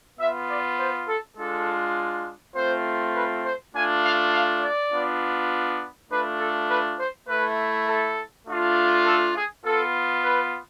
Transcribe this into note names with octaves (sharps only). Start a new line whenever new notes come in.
B3 F4 E5
D5
C5
A4
G#3 D4 F4 A4
A3 C4 F4 C5
B4
C5
A3 D4 F4 G#5
F5
F5
D5
B3 D4 F4
A3 D4 F4 B4
A4
B4
C5
A3 E4 B4
A4
A3 D4 F4
A4
G#4
B3 F4 A4
B4